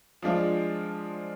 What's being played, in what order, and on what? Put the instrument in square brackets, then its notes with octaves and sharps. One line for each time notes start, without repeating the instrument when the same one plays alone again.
[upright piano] F3 G#3 D4 F4